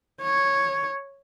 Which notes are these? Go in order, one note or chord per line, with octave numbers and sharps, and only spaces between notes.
C#5